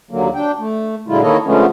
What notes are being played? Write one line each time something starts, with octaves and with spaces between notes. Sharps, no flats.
D#2 D3 F#3 A#3
D4 G5
A3
A#2 D3 F#3 G#3 E4 F4
D#3 A#3 E4 A4 C#5 D#5
D3 F3 G#3 A3 B3 C#4